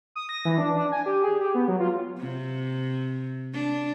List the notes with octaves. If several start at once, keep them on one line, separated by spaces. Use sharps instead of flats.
D#6
A#6
E3
D4
D4
G#5
G4
G#4
G4
B3
F#3
F4
C3
D4